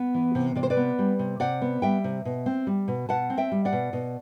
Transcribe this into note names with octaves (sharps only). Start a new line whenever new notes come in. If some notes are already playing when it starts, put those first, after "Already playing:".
Already playing: B3
E3
C3
C3 D5
C5
B4 D5
B3
G3
C3
C3 D5 F#5
B3
G3 E5 G5
C3
B2
C4
G3
B2
B2 F#5 A5
C4
E5 G5
G3
D5 F#5
B2
B2